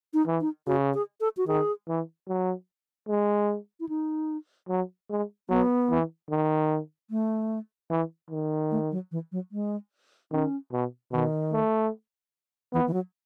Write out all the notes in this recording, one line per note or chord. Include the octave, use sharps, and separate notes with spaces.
D#4
E3
D#4
C#3 F#4
G#4
A4
F#4
D#3 G#4
E3
F#3
G#3
E4
D#4
F#3
G#3
F#3 B3
E3
D#3
A3
E3
D#3
A3
F#3
E3
F#3
G#3
D#3 C#4
B2
B2 D#3
A3
E3 B3
E3
F#3